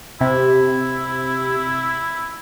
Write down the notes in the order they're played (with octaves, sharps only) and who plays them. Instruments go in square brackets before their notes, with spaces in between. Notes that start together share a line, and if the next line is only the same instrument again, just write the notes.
[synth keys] C3 [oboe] E4